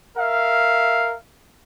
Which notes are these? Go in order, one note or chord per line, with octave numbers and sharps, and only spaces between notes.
A#4 E5 F5